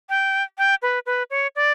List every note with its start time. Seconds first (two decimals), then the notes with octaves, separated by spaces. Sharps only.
0.09 G5
0.58 G5
0.82 B4
1.06 B4
1.30 C#5
1.56 D5